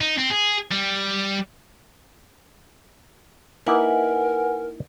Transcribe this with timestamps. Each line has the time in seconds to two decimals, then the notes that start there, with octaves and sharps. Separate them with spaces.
0.01 D#4
0.18 C4
0.30 G#4
0.71 G3
3.67 A#3 D#4 E4 A#4 B4 F#5 G#5